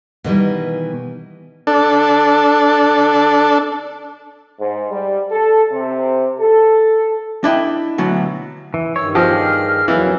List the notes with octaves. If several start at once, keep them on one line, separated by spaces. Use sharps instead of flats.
B2 D#3 E3 G3
D4 A4
G#2
G3
A4
C3
A4
D4 E4 D#5 G5
D2 B2 E3 F#3
E3
G2 D#3 C#5 E6
F3 G4 G#4 D#5 F6
F2 E3 F#3 A#3 F5